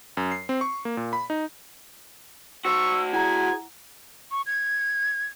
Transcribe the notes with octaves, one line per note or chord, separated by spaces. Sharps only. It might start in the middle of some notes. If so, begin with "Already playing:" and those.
F#2
C7
C4
C#6
A#3
A#2
B5
D#4
F#4 C5 C#6 E6
E4 G#4 F#5 G#5 A#5
C#6
G#6